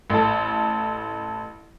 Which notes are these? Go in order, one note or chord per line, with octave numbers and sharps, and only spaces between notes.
A1 A4